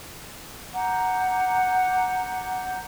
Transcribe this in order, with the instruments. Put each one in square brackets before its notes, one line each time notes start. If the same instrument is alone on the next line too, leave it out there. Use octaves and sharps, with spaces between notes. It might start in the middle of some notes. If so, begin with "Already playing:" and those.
[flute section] F#5 A#5 D6 G6